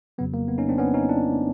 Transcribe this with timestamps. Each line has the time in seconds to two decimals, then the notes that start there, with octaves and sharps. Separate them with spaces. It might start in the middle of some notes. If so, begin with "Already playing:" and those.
0.18 G1 F2 C#3 F#3 B3
0.34 A#3
0.48 B3
0.58 C#4 D#4
0.69 C4 D4
0.78 B3 C#4
0.94 C#4 D#4
1.09 D4 E4